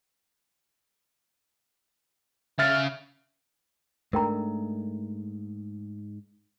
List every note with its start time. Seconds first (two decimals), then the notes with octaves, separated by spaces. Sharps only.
2.59 C#3 E5 F5 F6 A6
4.13 G#2 A3 D4 A#4 G5 A#5